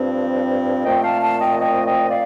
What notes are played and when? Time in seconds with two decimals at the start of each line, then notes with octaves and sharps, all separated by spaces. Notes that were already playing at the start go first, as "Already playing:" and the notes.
Already playing: G2 F3 C4
0.85 A#2 F3 A3 C4 D#5 G5
1.03 F5 A5
1.22 F5 A5
1.41 D#5 G5
1.60 D#5 G5
1.85 D#5 G5
2.10 D5 F5